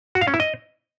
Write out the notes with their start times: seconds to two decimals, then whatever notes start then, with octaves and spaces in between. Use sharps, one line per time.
0.15 F#4
0.21 F5
0.28 C#4
0.34 E4
0.40 D#5